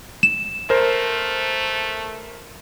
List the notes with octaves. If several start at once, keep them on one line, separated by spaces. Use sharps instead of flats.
E7
A3 A#4 C5